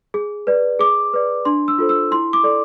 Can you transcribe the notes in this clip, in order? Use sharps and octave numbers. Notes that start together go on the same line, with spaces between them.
G#4
B4 D5
G#4 D6
B4 D5
D4 C6
E6
F4 A4 C5
E6
E4 C6
D6
A4 D5